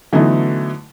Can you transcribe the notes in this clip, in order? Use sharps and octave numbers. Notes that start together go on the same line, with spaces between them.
D3 E3 F#3 A3 B3 D#4